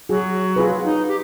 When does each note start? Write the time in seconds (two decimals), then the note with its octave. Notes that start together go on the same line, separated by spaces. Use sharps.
0.09 F#3 F#4 G#4
0.56 F4 G#4 B4
0.84 D#4
1.08 G4